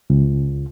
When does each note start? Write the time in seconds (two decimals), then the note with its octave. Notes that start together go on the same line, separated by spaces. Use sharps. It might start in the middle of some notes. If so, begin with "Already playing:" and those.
0.10 C#2